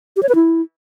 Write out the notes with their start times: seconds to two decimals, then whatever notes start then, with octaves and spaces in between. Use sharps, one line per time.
0.17 G4
0.23 C#5
0.29 B4
0.35 E4